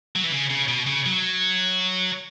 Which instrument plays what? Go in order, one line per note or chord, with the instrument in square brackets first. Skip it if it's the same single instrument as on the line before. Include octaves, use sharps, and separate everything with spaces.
[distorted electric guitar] F#3
E3
C#3
C#3
B2
C#3
F#3